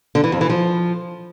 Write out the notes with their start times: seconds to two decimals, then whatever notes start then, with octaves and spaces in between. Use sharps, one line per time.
0.15 D3
0.24 E3
0.32 F2
0.41 E3
0.50 F3